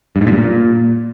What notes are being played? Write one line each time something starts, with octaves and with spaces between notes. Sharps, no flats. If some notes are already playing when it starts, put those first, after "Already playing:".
G2
G#2
A#2
G2
A#2